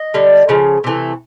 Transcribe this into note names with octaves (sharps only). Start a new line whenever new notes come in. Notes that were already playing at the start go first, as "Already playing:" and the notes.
Already playing: D#5
D3 G3
C#3 F3
C3 E3 A3